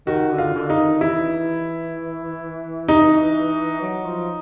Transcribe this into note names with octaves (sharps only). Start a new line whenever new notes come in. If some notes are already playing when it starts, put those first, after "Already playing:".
D#3 F#4
D3
F4
D3
D#4
D#3
E3 E4
D#4
F#3
F3